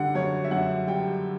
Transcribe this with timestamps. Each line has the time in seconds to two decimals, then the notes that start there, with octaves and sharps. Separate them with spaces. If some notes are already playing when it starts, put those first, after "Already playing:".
Already playing: D3 G3 F#5
0.15 F#2 C#5
0.44 E5
0.51 F#2 F#5
0.87 G3 G5